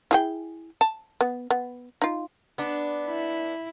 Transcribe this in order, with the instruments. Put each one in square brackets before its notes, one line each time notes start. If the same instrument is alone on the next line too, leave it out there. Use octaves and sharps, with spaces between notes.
[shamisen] E4 G#4 G5
A5
B3
B3
D#4 F4
[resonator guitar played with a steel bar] B3 D4
[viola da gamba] E4